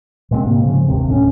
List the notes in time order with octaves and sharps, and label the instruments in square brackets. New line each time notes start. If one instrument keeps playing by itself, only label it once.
[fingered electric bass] A#2 G#3 A#3 C4
G#2 C3 A#3
C#3 F3 G#3
G1 D#2 C3
D1 A2 B3 C#4